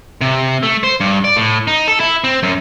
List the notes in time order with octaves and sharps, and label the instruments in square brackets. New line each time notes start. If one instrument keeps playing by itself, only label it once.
[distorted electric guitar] C3
A3
C5
G2
D5
A2
D#4
A4
E4
C4
F#2